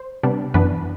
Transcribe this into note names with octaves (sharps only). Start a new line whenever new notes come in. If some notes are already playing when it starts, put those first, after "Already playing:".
Already playing: C5
C3 G3 B3 D4
F#2 E3 B3 D4 B4